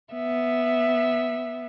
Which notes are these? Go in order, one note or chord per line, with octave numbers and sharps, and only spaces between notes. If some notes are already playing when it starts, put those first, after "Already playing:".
B3 E5